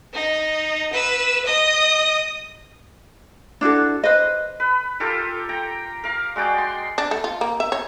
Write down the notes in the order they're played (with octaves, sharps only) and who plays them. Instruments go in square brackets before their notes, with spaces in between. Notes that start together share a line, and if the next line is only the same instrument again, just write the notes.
[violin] D#4
B4 E6
D#5 D#6
[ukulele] D4 E4 F#4 A4
B4 C5 D#5
[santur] B4
F4 G4 A4 A#4
G5 A#5
A#4 F5
G#3 F#4 D5 G5
C6
[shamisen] D4
A3
F4
A#3
E5
C#5